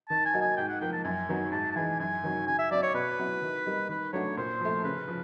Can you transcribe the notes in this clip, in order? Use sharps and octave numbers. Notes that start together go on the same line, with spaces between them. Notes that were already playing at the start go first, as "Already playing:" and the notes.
D#3 A5
G#5
F#3 A#3 D#4 F#4
G#5
G#2 G5
F#5
F3 A#3 G5
A5
F#2 G#5
D#3 F#3 B3
G#2 A5
A5
E3 G#3 G#5
F#2 G#5
D#3 F#3
C#3 G#5
E5
F#3 B3 D#4 D5
C#5
B2 B4
F#3 B3 E4
D#3
G3 A#3 D#4
D#3 B4
F#3 A3 D4 F#4 C#5
A#2 C5
F3 A3
C#3 B4
F3